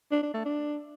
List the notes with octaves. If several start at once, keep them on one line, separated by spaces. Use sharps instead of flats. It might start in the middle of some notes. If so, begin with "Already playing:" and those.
D4
D4
A3
D4